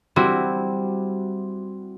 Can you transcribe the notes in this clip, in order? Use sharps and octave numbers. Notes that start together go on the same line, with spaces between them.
G3 C4 E4 F#4